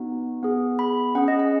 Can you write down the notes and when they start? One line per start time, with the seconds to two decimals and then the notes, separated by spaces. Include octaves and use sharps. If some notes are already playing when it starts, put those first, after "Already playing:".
Already playing: B3 D#4 F#4
0.43 B3 G#4
0.79 B5
1.15 C#4 G#4 F#5
1.28 D#5
1.40 F#5